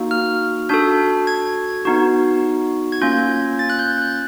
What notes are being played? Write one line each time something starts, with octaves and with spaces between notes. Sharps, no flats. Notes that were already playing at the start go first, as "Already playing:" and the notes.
Already playing: A#3 D#4 F#4
F6
D4 F#4 A4 G6
G#6
B3 D#4 F#4
G#6
A#3 C#4 F4 G6
A6
F#6
G6
F#6